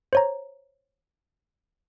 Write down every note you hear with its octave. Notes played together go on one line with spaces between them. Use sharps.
C5 C#5 A#5